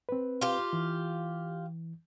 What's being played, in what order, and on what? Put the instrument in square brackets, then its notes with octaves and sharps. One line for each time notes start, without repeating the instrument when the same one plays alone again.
[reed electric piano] C4 B4
[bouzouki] F4 G4
[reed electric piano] E3